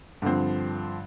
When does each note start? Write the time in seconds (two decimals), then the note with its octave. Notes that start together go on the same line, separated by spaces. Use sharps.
0.22 G2 D3 F3 C4